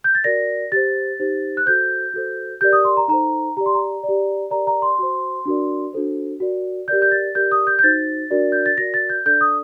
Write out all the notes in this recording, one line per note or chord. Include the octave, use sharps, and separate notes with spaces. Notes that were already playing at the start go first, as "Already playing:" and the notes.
G6
A6
F#4 A#4 D5 A#6
G4 C5 A6
D#4 G4 C5
F#6
F#4 A4 C5 G6
F#4 A4 C5
G4 A#4 D5 G6
D#6
C6
A#5
D#4 A4 C5 A#5
G4 D5 A#5
C6
A#5
G4 D5
G4 A#4 D5 A#5
A#5
C6
F#4 C5
D4 F#4 A#4 D5
D4 F#4 A4 C5
F#4 A#4 D5
G4 A#4 D5 G6
G6
A6
G4 A#4 D5 G6
D#6
G6
G6
D#4 F#4 C5 A6
D4 F#4 A#4 D5
G6
A6
F#4 A#4 D5 A#6
A6
G6
D4 A4 D5 G6
D#6